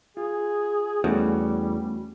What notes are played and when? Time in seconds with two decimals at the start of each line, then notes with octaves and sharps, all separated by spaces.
0.17 F4 G#4
1.04 E2 G3 A3 C#4 F#4